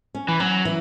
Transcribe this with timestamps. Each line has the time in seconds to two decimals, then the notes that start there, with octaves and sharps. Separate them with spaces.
0.15 C#4
0.28 E3
0.40 F#3 C#4
0.65 E3